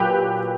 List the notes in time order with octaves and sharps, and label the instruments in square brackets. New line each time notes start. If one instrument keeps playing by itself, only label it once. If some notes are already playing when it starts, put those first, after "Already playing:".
Already playing: [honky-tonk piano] A#2 F#3 G4 B4